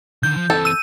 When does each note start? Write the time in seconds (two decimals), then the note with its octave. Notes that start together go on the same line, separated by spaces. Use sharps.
0.23 D3 D#3 G6
0.37 F3
0.50 E3 C4 A4
0.65 E6 D#7